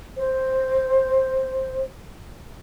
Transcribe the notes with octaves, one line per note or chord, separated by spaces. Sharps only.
C5